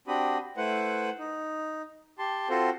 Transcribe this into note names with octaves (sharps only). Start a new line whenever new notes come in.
C4 D4 F#4 G4 B5 D#6
A3 E4 B4 C5 F#5
D#4
G4 A5 C6
C4 F4 F#4 A4 C5